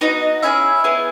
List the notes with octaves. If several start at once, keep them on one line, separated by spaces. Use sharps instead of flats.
B3 D#4 F#4 D#5
C#4 E4 G#4 E5
B3 E4 G#4